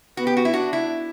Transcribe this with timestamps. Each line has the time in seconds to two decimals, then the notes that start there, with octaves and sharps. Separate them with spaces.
0.17 B3 F#4
0.27 G4
0.37 F#4
0.45 E4
0.54 D4 F#4
0.73 E4